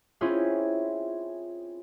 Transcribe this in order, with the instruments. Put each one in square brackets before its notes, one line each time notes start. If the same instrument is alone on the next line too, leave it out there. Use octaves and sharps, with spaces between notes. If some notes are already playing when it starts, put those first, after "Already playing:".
[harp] C4 C#4 E4 F4 G#4